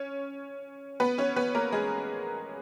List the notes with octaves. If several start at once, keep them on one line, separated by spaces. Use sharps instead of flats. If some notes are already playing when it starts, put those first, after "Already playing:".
Already playing: C#4 C#5
B3 B4
C#4 C#5
B3 B4
A#3 A#4
G#3 G#4